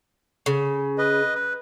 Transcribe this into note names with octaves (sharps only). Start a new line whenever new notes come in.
C#3
B4 D#5
B4